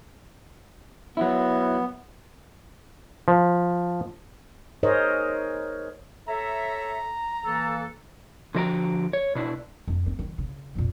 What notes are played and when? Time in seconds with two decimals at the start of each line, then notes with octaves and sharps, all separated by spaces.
1.17 F#3 B3 E4
3.28 F3
4.83 D#4 G#4 A#4 C5 C#5 D#5
6.28 A4 C#5 E5 A#5
7.45 E3 A#3 A4
8.55 D3 F3 F#4 C5 G5 A#5
9.13 C#5
9.35 B2 D4 E4
9.88 F2
10.06 C4
10.19 D#3
10.38 C#3
10.75 F2 A#2